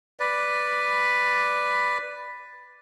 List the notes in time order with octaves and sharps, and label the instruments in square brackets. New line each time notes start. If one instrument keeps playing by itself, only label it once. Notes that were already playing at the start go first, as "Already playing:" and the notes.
[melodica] B4 D5